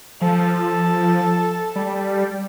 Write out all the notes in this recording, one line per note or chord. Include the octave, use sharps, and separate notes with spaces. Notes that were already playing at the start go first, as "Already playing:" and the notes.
F3 A4
G3